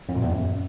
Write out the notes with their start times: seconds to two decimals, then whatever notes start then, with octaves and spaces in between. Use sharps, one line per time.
0.09 F2
0.15 A#2
0.22 E2
0.29 F#2